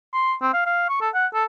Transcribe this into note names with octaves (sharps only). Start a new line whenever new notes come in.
C6
C4
F5
F5
C#6
A4
F#5
A4